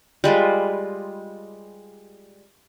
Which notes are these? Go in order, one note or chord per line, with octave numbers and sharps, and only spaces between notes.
G3 G#3 F4 B4